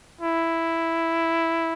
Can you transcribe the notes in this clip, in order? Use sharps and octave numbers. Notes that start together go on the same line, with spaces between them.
E4